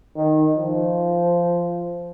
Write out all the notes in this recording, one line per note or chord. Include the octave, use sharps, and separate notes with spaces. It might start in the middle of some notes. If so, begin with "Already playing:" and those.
D#3
F3